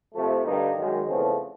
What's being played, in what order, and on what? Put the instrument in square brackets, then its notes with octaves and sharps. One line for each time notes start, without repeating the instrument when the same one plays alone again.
[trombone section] F2 C3 F3 A3
G2 D3 G3 A#3 D#4
F#2 D#3 G#3
E2 C#3 F3 A3 C4